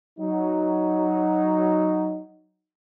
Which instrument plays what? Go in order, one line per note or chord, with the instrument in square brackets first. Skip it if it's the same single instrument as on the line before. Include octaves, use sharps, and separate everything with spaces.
[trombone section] F#3 D#4